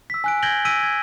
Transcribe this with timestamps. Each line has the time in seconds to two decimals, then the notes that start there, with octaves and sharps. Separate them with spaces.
0.10 E6 B6
0.24 G#5 F#6 D7
0.43 G6 G#6 A#6 D7 F#7 G7
0.65 E6 A#6 B6 D7 D#7
0.83 G#6